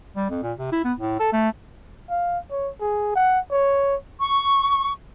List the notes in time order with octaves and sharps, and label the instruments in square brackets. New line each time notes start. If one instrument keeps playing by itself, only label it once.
[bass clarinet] G3
F2
A#2
C3
E4
B3
A2
A4
A3
[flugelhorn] F5
C#5
G#4
F#5
C#5
[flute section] C#6